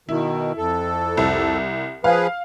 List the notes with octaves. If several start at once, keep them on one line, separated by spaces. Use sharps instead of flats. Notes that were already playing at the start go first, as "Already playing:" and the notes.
B2 D#3 E4
F2 A4
C2
F3 G#4 B4 F5